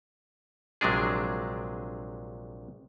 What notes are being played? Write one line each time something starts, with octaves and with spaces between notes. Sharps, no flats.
A#1 C3 F#3 G#3 D4 G#4